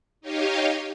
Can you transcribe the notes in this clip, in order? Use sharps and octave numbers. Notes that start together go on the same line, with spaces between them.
D#4 G4 C#5 D#5 F5